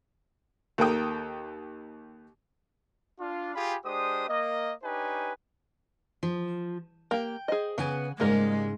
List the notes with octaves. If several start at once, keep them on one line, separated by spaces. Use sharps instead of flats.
D#2 A#3 A4 G5 D#6
D4 F4
F4 G4 G#4 G5 G#5 B5
G#3 D4 G4 C5 D#6
A#3 D#5
D4 D#4 G4 B4 C#5 G#5
F3
A#3 G4 G5
G#4 C5 D#5
C#3 B3 F#5 G#5
G#2 C#3 G3 G#3 A#3 A#4